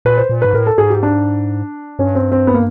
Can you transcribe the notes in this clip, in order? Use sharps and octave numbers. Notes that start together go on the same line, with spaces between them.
A#2 B4
C5
A#2
G#2 B4
A2 A#4
A4
G#2 G#4
G4
D4
G2 C#4
C4
C4
B3
A#3